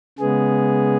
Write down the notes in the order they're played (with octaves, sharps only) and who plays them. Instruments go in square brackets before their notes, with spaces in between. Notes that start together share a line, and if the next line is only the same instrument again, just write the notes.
[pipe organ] C#3 G#3 B3 G#4